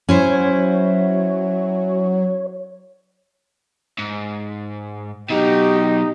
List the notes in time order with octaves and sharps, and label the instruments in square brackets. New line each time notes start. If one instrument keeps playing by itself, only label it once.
[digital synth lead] F#3 [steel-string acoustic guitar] C#4 E4 C5 [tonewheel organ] C#5
[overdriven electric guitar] G#2
[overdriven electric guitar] B2 F#3 [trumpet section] D#4 [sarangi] G4